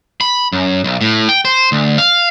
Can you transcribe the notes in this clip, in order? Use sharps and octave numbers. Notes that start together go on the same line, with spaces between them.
B5
F#2
B1
A2
G5
C5
D2
F5